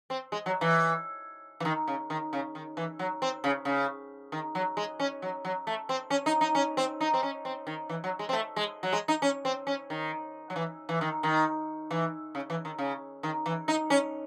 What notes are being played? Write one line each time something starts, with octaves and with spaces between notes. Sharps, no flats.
C4
G#3
F#3
E3
E3
D#3
C#3
D#3
C#3
D#3
E3
F#3
C4
C#3
C#3
D#3
F#3
G#3
C#4
F#3
F#3
A3
C4
C#4
D#4
D#4
C#4
C4
D#4
C4
C#4
C4
D#3
E3
F#3
G#3
C4
A3
G#3
F#3
G#3
D#4
C#4
C4
C#4
D#3
F#3
E3
E3
D#3
D#3
E3
C#3
E3
D#3
C#3
D#3
E3
D#4
C#4